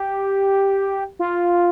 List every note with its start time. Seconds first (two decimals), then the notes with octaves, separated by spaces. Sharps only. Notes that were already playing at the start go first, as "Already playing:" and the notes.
Already playing: G4
1.19 F4